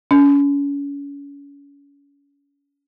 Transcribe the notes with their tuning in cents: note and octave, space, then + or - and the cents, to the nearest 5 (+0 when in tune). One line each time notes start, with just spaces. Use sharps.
C#4 +35